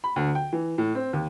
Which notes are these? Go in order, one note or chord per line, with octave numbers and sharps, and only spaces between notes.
B5
D2
G5
E3
A2
C4
D#2